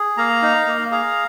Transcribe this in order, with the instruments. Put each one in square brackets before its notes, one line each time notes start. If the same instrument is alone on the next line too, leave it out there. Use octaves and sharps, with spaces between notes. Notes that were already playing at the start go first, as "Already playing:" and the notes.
Already playing: [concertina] G#4
A#3 F5 A#5
D#4
A#3
G#4 F5 A#5